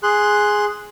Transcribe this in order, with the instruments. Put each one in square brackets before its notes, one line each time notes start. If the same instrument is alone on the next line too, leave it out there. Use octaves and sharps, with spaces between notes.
[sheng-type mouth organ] G#4 C6 F#6